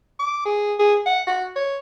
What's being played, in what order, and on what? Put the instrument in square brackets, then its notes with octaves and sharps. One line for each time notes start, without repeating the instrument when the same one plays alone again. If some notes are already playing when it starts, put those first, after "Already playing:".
[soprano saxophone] D6
G#4
G#4
F#5
F#4
C#5